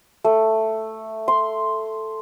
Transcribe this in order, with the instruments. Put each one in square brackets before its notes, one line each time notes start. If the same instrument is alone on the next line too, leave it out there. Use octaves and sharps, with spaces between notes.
[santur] A3
C6